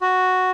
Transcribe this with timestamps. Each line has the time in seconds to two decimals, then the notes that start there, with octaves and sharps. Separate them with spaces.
0.01 F#4